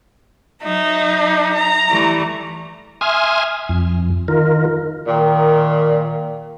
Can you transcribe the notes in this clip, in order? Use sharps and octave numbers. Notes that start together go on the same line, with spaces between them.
F#3 D#4 E5
A#5
E3 G3 A3
E5 G#5 C6 D#6 F6
F2
D#3 F4 A#4
A#2 D#3